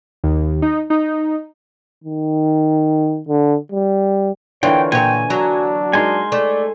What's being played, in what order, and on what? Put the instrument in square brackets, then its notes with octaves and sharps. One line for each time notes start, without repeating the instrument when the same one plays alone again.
[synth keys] D#2
D#4
D#4
[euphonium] D#3
D3
G3
[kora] D3 E3 A#3 [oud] F4 [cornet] C#5 [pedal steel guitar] G5
[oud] A#2 C#5 [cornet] G5 [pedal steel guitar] G#5
[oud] F#3 [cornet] D4
[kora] G#3 D#4 A#4 [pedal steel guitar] G#5 C6
[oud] A3 [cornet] D5